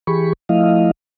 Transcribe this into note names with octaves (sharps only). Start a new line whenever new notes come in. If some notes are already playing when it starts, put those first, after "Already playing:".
E3 G4 G#4 B5 C#6
F3 A3 E4 D#5 F5